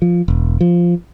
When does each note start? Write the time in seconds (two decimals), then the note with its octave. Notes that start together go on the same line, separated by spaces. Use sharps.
0.02 F3
0.28 E1
0.61 F3